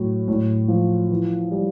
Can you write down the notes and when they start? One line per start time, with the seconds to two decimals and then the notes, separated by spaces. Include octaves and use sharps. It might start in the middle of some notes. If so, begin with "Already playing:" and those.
Already playing: A2 F#3
0.28 A2
0.68 F3
1.10 E3
1.51 G3